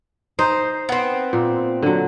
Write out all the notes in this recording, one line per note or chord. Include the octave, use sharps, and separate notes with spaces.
D#4 C5 D#5
B3 C4
A#2
D3 F#3